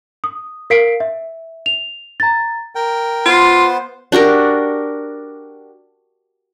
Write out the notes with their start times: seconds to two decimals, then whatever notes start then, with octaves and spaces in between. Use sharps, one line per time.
0.24 D#6
0.70 A#4 F5 B6 C7 D7
1.00 E5
1.66 F7
2.20 A#5 A6
2.75 A#4 G5
3.26 B3 F4 C5
4.12 D4 F#4 G4 A#4